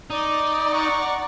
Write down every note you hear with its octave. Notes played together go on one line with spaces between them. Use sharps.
D#4 D5
F#5 A#5 C#6